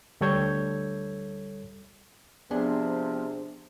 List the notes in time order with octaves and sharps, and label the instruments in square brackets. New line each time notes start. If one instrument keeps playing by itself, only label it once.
[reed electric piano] D2 G3 A4 C#5 G6 G#6
[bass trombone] C3 [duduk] F3 [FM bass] B3 [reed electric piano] D4 G#4